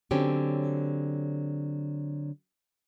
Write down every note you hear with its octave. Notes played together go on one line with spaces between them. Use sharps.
D3 F#3 C4 C#4 G4